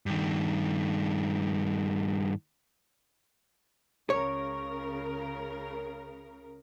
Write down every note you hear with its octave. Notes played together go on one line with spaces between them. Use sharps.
G2 D#3
C#2 C#3 A#4 C#5